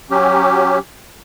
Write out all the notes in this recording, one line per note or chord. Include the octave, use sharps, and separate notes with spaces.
F#3 C#4 G4